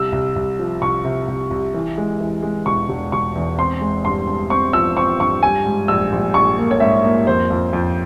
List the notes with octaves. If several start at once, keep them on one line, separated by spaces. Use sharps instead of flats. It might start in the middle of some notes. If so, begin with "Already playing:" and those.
Already playing: C2 E6
C2
C2
F3
C2 C#6
C3
C2
C2
E3
G#3
E3
G#3
E1 C#6
E1
E1 C#6
E2
C4 C6
G#3
G2 C6
G2
C4 C#6
F3 E6
C4 C#6
G2 C#6
G3 G#5
G#2
A#1 E6
A#1
A#1 C#6
A#3
C#5
G#2 E5
A#3
F2 C5
F2
F2